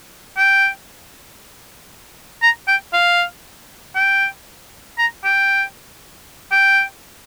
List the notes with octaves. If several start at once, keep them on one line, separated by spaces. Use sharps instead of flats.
G5
A#5
G5
F5
G5
A#5
G5
G5